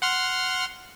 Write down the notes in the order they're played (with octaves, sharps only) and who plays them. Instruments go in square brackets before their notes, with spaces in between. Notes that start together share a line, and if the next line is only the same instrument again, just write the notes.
[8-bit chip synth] F#5 C6 F6